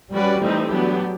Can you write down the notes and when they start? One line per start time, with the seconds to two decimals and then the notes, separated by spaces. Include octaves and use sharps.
0.13 G3 C#4 F#4 B4 D5
0.41 E3 A3 C4 D#4 G4
0.70 F#3 B3 D4 G4